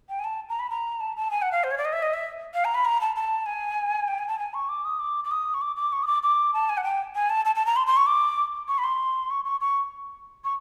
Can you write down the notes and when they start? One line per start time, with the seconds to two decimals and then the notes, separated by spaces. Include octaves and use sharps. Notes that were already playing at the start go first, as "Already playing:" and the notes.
0.09 G5
0.19 G#5
0.24 A5
0.49 A#5
0.59 B5
0.70 A#5
1.00 A5
1.17 A5
1.31 G#5
1.42 F#5
1.52 F5
1.64 C5
1.71 C#5
1.78 D5
1.85 D#5
1.93 E5
2.02 D#5
2.14 E5
2.54 F5
2.65 A#5
2.75 B5
2.85 A#5
3.01 A5
3.16 A5
3.46 G#5
4.08 G5
4.19 G#5
4.28 A5
4.39 G#5
4.54 C#6
4.69 D6
4.85 D#6
5.00 D6
5.24 D6
5.31 D#6
5.54 C#6
5.61 D6
5.76 D6
5.92 C#6
6.03 D#6
6.07 D6
6.23 D6
6.54 A5
6.69 G#5
6.77 F#5
6.84 G5
7.15 G#5
7.30 A5
7.45 A5
7.55 A5
7.66 A#5
7.76 C6
7.87 C6
7.97 C#6
8.07 D6
8.68 C#6
8.78 B5
8.84 C6
9.30 C#6
9.45 C#6
9.61 C#6
10.44 C#6